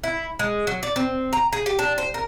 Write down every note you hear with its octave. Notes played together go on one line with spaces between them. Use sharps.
E4
G#3
F#3
D5
C4
A#5
G#4
G4
D4
C5
A#4